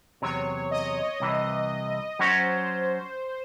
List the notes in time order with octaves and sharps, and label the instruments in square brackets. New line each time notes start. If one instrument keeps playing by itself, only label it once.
[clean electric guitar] E2 C3 F#3 [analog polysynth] C#5
[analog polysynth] D#5
[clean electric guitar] C2 C3 E3
[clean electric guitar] F#3 C#4 F#4 C#5 [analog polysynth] C5